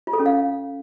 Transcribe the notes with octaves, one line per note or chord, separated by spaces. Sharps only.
F4
A4
C#4
F5